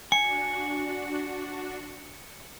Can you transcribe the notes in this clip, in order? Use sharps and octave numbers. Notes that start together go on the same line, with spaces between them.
D4 F#4 G#5 C#7